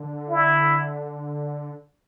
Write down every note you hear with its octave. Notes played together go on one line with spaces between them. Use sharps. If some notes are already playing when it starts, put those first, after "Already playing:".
Already playing: D3
E4